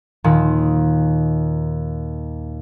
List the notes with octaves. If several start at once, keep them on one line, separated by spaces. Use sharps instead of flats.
D#2 A#2 D#3